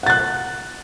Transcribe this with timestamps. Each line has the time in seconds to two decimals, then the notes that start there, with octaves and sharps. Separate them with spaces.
0.03 F#5
0.06 A6
0.10 F#6